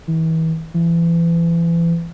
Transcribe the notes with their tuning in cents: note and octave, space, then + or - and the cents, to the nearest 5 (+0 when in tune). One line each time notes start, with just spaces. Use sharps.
E3 -35
E3 +30